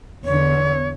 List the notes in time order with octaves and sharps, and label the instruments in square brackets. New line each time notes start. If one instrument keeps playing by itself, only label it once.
[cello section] E2 D3 [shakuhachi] C#5